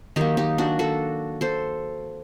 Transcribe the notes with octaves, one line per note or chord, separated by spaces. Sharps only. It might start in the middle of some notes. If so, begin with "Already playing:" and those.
D#3 F#3 A#3 D#4 G4
D#4 G4
D4 F#4
F#4 A4
A4 C5